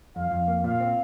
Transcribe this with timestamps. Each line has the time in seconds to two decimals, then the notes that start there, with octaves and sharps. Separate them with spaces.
0.16 F2 F5
0.31 F2
0.48 A#3
0.64 A#2 F5
0.80 C4